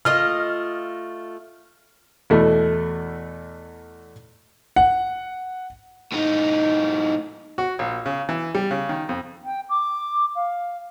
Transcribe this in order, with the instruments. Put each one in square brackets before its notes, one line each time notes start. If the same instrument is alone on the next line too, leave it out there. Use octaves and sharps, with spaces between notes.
[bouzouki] A3 F4 D#5 [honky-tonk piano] F6
[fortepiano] E2 B2 A3
[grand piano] F#5
[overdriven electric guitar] A2 D#4
[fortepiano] F#4
A#1
C#3
E3
G3
C#3
D#3
F2
[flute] G5
D6
F5